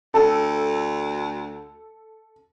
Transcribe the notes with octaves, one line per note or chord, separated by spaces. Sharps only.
D2 A4